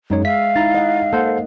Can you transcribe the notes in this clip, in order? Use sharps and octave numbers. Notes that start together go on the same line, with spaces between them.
F#2 G#3 D#4 C#5
E5 F5 B6
D#4 E4 A#5 A6
D#5 F#5
A#3 A4 C5 F#5